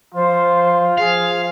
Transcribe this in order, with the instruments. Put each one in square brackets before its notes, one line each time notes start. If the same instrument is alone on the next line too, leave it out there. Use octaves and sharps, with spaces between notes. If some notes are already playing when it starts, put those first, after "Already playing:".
[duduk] F3 [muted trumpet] F4 [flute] C5
[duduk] F3 [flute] G#4 [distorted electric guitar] F5